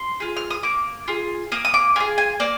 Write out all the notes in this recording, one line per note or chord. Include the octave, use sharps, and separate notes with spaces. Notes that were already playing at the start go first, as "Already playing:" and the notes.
Already playing: C6
F4 G#4
F6
D#6
A#3 D6
F4 G#4
A#3 D#6
D#6
D6
F4 G#4 G#5
G#5
A#3 D5